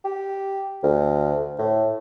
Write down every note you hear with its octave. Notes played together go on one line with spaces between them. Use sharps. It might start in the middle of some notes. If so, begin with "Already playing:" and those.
G4
D2
A2